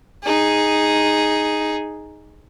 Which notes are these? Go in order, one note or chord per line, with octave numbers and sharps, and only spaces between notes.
D#4 G#4